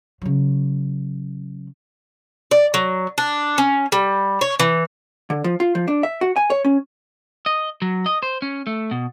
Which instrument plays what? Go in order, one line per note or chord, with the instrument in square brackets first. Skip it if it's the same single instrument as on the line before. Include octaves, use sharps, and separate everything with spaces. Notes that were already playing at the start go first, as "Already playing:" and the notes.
[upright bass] C#3 F#3
[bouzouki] D5
F#3
D4
C#4
G3
C#5
E3
[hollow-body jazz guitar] D3
F3
F4
F3
D4
E5
F#4
G#5
C#5
C#4
[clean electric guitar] D#5
F#3
D#5
C5
C#4
A3
B2